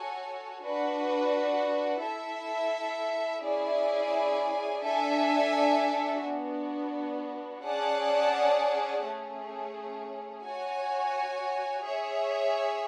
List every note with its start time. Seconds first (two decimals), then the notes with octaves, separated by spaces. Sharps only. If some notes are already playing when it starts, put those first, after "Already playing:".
Already playing: F#4 A4 C#5 G#5
0.61 D4 F#4 B4
2.00 E4 A4 E5
3.41 C#4 E4 G#4 D5 G#5
4.82 D4 A4 E5 G#5
6.21 B3 D4 F#4
7.62 C#4 G#4 D5 F#5 A5
9.02 A3 C#4 G#4
10.42 F#4 C#5 G#5
11.83 G#4 C#5 E5